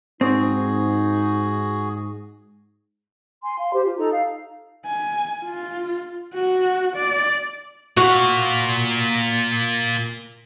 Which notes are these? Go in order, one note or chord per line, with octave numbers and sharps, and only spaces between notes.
G#2 C4 D#4 F#4 G#4
G#5 C6
F5 C6
G4 C5
F4
D#4 A4 A#5
F5
G#5
F4
F#4
D5
A#2 F#4 F5